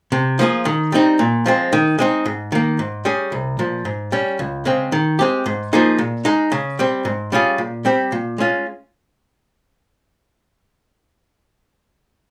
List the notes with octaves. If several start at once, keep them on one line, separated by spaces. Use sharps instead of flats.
C3
F3 A#3 F4 G#4
D#3
G3 C4 D#4
A#2
F3 G#3 C4
D#3
G#3 C4 D#4
G#2
D#3 A#3
G#2
G3 C#4 G#4
C2
A#2 F3
G#2
G3 C#4
C#2
C#3 G#3 C4
D#3
G#3 C4 G4
G#2
F3 A#3 D#4 G#4
A#2
G#3 D#4
C#3
G3 C4
G#2
G3 C#4 F4 G#4
A#2
G3 C4 G4
A#2
G#3 C#4 F4